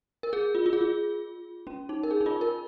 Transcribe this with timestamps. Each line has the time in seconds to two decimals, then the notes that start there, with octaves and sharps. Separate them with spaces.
0.23 A#4
0.33 G#4
0.55 F4
0.66 F4
0.73 G#4
0.81 F4
1.67 C#4
1.89 D#4
2.03 A#4
2.11 G#4
2.21 D#4
2.26 F4
2.41 A#4